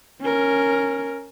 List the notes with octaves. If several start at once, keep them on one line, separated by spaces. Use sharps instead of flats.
C#4 A#4